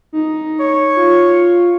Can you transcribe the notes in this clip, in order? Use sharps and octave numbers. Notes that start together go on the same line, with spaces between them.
D#4
C#5
F4